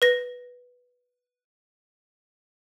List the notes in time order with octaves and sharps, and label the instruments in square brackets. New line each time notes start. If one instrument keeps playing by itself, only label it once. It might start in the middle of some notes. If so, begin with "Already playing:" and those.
[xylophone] B4 A#6